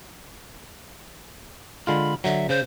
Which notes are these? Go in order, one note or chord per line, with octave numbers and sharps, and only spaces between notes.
D3 G#3 F4 B5
D3 F#3 E5
C#3 C5